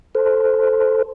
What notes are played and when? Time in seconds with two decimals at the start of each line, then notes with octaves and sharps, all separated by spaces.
0.15 A4 C5